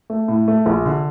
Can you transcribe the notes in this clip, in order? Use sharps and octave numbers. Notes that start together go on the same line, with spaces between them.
A3
A2
A3
A#1
D3